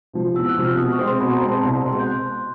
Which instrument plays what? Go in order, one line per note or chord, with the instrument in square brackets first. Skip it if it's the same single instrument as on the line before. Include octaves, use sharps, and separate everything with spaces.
[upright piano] C3 F3
[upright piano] E2 [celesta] E6
[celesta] F#6
[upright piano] C3 F3
[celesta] F6
[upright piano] B2 [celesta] D#6
[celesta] C#6
[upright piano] G#3 C4
[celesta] C6
[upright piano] B2 [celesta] B5
[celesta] A#5
[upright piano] G#3 C4
[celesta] A5
[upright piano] C2
B2 G#3 C4
[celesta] C6
G6
F#6